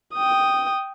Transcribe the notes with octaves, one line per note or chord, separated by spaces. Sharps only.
G5 D#6